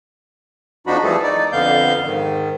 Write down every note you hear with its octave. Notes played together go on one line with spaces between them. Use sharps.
F2 F3 D4 D#4 F#4 B5
E3 F3 G3 A3 G#4 A4
D#4 D5
F2 D3 B3 F5 G6
G#2 D#3